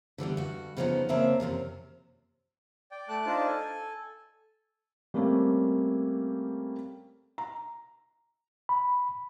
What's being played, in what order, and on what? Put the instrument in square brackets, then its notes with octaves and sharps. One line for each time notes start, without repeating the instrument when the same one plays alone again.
[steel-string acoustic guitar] D3 E3 G3 B3
G2 F#4
G2 C#3 F3 G#3 B3 D#4
C#3 A#3 C4 E5 A5
F#2 A2 C3 F3
[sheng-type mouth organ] D5 G5
A3 A5 D6 F#6
D4 D#4 F4 C5 D5 A5
A4 G#5
[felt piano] G3 A3 A#3 C4 C#4
A#5
[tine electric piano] B5